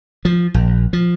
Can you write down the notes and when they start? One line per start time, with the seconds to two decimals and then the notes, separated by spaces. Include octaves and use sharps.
0.25 F3
0.54 A#1
0.93 F3